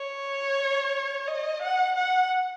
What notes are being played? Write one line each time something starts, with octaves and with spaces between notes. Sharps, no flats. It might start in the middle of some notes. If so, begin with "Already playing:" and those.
Already playing: C#5
D#5
F#5
F#5